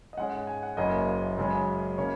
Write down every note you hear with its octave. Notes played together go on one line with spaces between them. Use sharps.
D#5
G#2 G#3 C#4 F#5
G#5
F#5
F#1 F#2 C#3 A#3 C#4 D#5
F#2 C#3 G#3 C#4
C#3 A#3 C#4 C#5